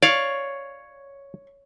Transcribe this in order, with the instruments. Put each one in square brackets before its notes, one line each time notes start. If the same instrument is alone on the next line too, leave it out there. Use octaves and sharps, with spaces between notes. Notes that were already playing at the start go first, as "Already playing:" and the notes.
[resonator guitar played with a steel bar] C#5 [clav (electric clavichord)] D5 F5